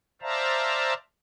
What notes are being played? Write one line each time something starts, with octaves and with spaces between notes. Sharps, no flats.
C5 D5 E5 F5 A5 A#5